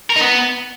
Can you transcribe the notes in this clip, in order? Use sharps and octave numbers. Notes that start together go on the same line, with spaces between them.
A#4
D#4
B3